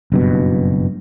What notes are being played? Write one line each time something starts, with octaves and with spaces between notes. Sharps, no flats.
F#1 G2 B2